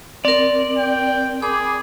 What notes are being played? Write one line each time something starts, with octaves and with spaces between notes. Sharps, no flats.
C4 A#4 D5
G5
G#4 B5 D6